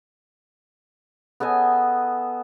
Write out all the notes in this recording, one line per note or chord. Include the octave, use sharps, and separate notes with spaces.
B3 A4 D#5 G#5